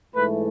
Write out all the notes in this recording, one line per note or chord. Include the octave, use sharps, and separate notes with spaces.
G#2 E3 A3 B4